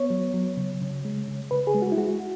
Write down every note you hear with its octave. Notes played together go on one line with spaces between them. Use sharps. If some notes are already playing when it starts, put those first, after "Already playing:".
Already playing: B3 C#5
F#3
F#3
C#3
C#3
G#3
C#3
C#3 B4
G#4
G#3
F#4
E4
G#3 F#4